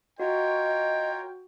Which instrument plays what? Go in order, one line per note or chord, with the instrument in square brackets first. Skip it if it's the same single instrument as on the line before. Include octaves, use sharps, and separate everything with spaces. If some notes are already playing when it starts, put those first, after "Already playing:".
[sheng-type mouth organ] F4 A#4 C#5 [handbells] F#4 [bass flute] D#5 [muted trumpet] G5